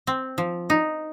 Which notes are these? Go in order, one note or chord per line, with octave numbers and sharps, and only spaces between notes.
C4
F3
D#4